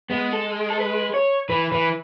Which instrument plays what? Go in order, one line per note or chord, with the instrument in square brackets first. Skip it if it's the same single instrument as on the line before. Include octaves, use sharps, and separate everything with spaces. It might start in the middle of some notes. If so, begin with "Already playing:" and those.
[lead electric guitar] G#3 [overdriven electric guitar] B3
[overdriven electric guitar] A4
A4
B4
C#5
[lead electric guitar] E3 [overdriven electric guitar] B4
[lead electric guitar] E3 [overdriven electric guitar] B4